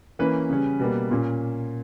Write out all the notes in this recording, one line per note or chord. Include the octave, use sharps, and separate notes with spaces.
E3 A#3 C#4 B4
C#3 G3 C#4
B2 G3 A#3
A#2 A#3 C#4